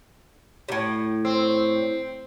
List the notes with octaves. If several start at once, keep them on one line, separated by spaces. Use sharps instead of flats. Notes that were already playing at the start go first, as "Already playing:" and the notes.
A2 C3
C4